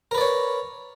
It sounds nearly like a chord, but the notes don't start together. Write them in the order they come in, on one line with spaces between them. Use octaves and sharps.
A#4 B4 D5 C#5